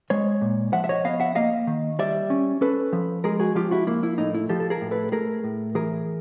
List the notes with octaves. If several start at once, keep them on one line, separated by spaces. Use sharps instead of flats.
G#3 C#5 D#5
A#2
F3 E5 F#5
E5
C#5 D#5
B3 D#5 F5
E5 F#5
A#3 D#5 F5
D#3
G3 D5 E5
C#4
C#4 A4 B4
F3
G#3 G#4 A#4
F#4 G#4
F3 F4 G4
E4 F#4
A#3 E4
E4
A2 D#4
E4
F3 G4 A4
A4
G#4 A#4
A2
A4 B4
A3 G#4 A#4
A2
E3 G#4 A#4